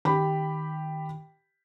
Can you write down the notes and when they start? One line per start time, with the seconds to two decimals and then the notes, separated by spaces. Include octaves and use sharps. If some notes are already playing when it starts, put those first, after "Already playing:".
0.05 D#3 G4 G5 B5